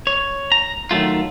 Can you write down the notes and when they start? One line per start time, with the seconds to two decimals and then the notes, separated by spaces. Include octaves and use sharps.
0.07 C#5
0.52 A#5
0.91 D#3 F#3 G#3 A3 F4